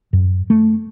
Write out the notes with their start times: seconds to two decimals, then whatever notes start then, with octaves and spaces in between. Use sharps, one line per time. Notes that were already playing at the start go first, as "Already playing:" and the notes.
0.13 F#2
0.50 A3